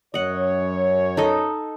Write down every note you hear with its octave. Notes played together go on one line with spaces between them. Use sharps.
F#2 C#5 D#5 F#5
D#4 A4 D#5